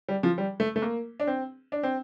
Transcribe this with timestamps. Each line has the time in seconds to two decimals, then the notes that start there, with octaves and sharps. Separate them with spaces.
0.08 G3
0.23 F3
0.38 G3
0.60 A3
0.76 A3
0.82 A#3
1.20 D4
1.27 C4
1.72 D4
1.83 C4